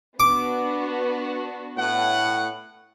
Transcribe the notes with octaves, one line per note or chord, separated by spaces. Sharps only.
B3 D4 F#4 D6
A2 F#5